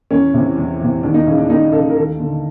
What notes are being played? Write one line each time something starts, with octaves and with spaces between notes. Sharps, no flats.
E2 C#4
C3 E3
E2
C3 E3
D#2 D4
D#4
C#3 E3
D4
D#2 D#4
C#3 A4
E3
A#4
D#2 A4
D3